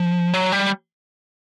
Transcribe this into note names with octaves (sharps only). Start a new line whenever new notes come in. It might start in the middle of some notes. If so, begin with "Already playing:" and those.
Already playing: F3
F#3
G3